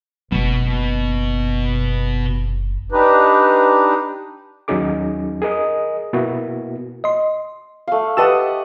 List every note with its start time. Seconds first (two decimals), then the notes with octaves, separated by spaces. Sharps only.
0.32 F#1 B2 B3
2.92 D4 D#4 G4 B4
4.68 D#2 F#3 C#4 D#4 G#4 D6
5.42 G#4 A#4 D#5 D#6
6.13 B2 A#3 B3 E4 F#4
7.04 D#5 C6
7.88 A3 F5
8.17 G4 B4 D#5 F#5 A5 E6